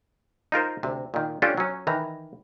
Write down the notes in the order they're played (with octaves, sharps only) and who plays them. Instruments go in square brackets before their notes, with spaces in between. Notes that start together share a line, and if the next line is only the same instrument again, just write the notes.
[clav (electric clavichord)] D#4 F4 A#4 C5
D2 C3
A#2 D#3
C#4 D4 F4 G4 A4
F#3 C#4
D#3 E3 A#5